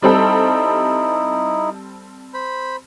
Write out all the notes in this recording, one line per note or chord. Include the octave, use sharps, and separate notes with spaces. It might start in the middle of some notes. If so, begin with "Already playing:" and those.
G3 C4 D#4 E4 A4
C5 B5